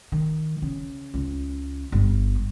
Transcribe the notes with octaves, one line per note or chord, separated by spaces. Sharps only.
D#3
C#3
C#2
G1